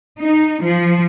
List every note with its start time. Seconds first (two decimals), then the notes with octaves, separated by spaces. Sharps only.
0.20 D#4
0.62 F3